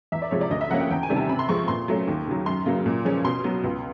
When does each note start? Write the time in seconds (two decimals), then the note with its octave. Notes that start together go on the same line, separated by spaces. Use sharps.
0.12 E2 E5
0.22 D5
0.31 C3 F3 G#3 C#5
0.41 D5
0.51 D2 D#5
0.61 E5
0.71 C#3 F3 A#3 C#4 F#5
0.80 G5
0.90 E2 G5
1.03 G#5
1.10 C3 D#3 G3
1.16 A5
1.29 C3 B5
1.39 C6
1.49 F3 G#3 C4 C#6
1.68 A#2 C6
1.88 F#3 A3 C#4
2.07 D#2
2.27 C#3 F#3
2.46 F#2 C6
2.66 C#3 F#3 A#3
2.86 A#2
3.05 F3 G#3 C#4
3.25 B2 C6
3.44 F#3 B3
3.64 C#2